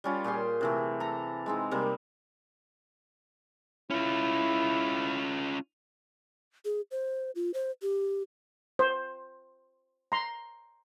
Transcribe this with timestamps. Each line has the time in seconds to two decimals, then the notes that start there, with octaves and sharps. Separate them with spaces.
0.04 G3 C#4 F4
0.24 A#2 G4 G#4 C6
0.61 C3 E3 A3
1.00 A4 A#5
1.46 G#3 C4 D#4
1.71 C3 G3 A#3
3.91 C#4 E4 F4
6.65 G#4
6.91 C5
7.35 F4
7.54 C5
7.82 G4
8.79 C5
10.12 A#5 C6